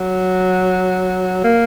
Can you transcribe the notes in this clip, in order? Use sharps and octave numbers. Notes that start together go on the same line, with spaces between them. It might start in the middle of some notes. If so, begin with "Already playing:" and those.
Already playing: F#3
A#3